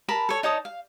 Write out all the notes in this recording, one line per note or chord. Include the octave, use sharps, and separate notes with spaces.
A#4 A5 B5
A4 C#5
D#4 C#5 A5 D#6
F5